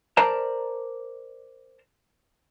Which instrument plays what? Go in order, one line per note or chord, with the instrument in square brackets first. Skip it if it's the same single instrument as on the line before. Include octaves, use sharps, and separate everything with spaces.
[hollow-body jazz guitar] A#4 C5 D5 A5 A#5